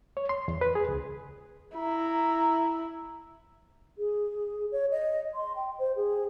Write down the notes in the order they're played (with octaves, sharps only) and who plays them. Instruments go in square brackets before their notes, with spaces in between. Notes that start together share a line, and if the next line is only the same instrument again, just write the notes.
[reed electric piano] C#5
C6
E2
B4
G#4
C#2
[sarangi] E4 [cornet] A#5
[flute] G#4
C#5
D#5
C6
G5
C5
G#4